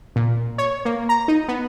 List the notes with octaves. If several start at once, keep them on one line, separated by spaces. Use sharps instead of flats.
A#2
C#5
A#3
A#5
D#4
B3